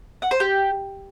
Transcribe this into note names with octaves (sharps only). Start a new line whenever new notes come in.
F#5
C5
G4